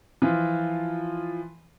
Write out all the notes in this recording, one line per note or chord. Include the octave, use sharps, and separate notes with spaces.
E3 F3 F4